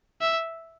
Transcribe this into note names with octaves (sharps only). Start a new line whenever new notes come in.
E5